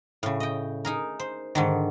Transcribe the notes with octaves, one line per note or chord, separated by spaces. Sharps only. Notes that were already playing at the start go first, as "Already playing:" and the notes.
A2 C#3
D#5 G5
D#4 G#4 A#4
C5
G#2 D3 D#3